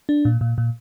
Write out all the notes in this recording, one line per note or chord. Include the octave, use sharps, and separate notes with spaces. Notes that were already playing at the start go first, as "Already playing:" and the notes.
D4
A#2
A#2
A#2